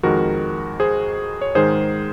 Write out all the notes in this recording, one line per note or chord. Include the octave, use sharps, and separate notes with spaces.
F2 D#3 G#3 F#4 A#4
G#4 C5
C#5
G#2 D#3 G#3 G#4 C5